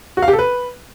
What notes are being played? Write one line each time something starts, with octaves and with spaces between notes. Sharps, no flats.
F#4
F5
G4
A4
B4